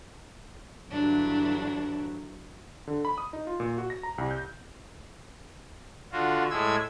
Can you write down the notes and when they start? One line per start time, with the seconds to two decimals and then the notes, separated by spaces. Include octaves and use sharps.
0.90 G2 D3 E3 F#3 D4 E4
2.87 D3
3.05 B5
3.18 D#6
3.33 D#4
3.47 F4
3.60 A#2
3.78 F#4
3.90 A#6
4.03 A#5
4.18 C2
4.31 G6
6.12 D3 F4 F#4
6.50 A2 G#3 E6 G#6